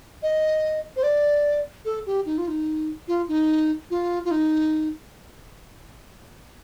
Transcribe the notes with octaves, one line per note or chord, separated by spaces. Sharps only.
D#5
C5
D5
A4
G4
D#4
F4
D#4
F4
D#4
F4
F4
D#4